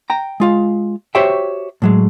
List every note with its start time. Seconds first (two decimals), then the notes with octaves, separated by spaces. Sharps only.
0.10 G5 A#5
0.40 G#3 F4 F5
1.15 F#4 G4 C5 C#5 E5 G5
1.82 A2 F#3 G#3